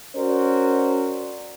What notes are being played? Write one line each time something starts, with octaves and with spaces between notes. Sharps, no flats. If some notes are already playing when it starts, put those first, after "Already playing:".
C#4 F#4 A#4 C5 D5